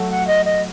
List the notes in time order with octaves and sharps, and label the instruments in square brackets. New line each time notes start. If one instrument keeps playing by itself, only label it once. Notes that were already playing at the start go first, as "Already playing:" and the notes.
Already playing: [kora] F#3 A3
[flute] F#5
D#5
D#5